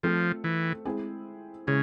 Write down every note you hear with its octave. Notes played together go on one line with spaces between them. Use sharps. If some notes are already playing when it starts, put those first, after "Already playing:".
F3 A3 C4 F4 A4
E3
G#3 C4 E4 G#4
C#3 G#3 C#4 E4 G#4